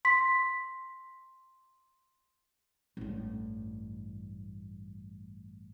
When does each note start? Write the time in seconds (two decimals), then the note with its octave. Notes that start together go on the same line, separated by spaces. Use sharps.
0.05 C6 B6
2.97 A1 G2